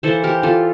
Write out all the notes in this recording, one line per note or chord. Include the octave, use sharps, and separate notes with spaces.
E3 A#3 A4 C5
G4 A#4
F4 A4